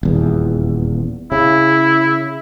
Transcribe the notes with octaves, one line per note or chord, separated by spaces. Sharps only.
D#1 E2
C#3 E4